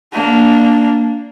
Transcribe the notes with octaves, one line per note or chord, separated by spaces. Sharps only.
A#3 D4